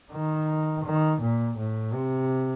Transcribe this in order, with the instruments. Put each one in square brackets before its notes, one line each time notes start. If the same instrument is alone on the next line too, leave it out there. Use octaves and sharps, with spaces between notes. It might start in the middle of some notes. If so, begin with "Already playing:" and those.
[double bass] D#3
D#3
A#2
A2
C3